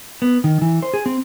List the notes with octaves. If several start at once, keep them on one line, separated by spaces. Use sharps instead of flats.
B3
D#3
E3
C5
G#4
C4